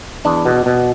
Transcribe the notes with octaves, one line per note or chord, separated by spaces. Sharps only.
E2 D4
B2
B2